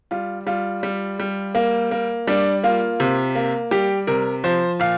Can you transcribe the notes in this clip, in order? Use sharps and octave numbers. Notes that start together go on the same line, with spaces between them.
G3 F4
G3 F4
G3
G3
A#3
A#3
G3 D4
A#3 F4
C3
A#3
G3 G4
C3 A#4
F3 C5
A#2 F5